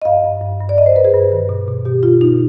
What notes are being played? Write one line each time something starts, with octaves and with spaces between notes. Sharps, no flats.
D#5
G2 F5
G2
G2
G2
D5
G2 D#5
C5
G2 B4
G#4
G2
D#3
B2
B2
B2 G4
B2 F4
B2 D#4